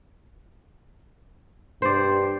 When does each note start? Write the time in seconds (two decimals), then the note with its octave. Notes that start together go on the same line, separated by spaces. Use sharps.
1.82 G2 C5 D5